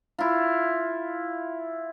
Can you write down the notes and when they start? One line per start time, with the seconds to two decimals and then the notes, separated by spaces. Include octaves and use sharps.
0.18 E4 F4